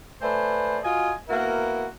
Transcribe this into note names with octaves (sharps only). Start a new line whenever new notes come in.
A3 B4 C5 D5 G#5
F4 F#4 D#5 G#5
A#3 B3 E4 F#4 A#4